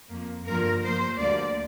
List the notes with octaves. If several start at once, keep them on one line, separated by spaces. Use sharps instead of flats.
F2 F3 A#3
G2 D3 F3 A#3 A#4
G2 F3 A#3 C5
D2 D3 G3 A#3 D5